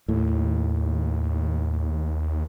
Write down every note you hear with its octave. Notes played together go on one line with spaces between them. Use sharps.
D#2 A2